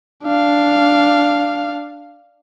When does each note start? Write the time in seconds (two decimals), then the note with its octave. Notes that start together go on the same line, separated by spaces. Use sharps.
0.24 D4 F5